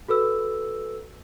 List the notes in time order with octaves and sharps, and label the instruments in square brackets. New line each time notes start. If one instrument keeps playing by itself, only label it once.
[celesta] F#4 A4 B4 E6